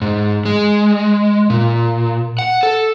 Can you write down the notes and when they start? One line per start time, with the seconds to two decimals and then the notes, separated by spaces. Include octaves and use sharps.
0.01 G#2
0.45 G#3
1.50 A#2
2.39 F#5
2.63 A4